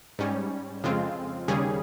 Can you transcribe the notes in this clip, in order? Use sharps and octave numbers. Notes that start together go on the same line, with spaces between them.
G#2 G3 C#4
F2 C#3 G#3 C4 F4
D#2 C#3 G3 C#4 G#4